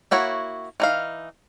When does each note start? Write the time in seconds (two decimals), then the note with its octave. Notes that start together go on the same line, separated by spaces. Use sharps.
0.11 A#3 E4 F#4 C#5
0.80 E3 D#4 F5